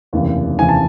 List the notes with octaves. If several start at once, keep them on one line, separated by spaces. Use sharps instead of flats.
F1 D#2 C#3 E3
F1 D#2 C#3 E3 G#5
A5